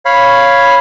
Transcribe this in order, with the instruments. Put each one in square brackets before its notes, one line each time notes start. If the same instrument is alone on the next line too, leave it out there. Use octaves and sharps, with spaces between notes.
[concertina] C#5 F5 B5